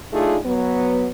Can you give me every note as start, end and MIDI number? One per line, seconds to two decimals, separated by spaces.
0.12 0.36 57
0.12 0.36 62
0.12 0.36 63
0.12 0.36 65
0.12 0.36 68
0.43 1.09 54
0.43 1.09 59